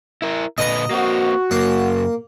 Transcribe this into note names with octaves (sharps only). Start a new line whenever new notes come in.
E4 A#4
A#2 D3 B4 D#5 A#5
A#3 C4 F#4
F#2 C#3 A#3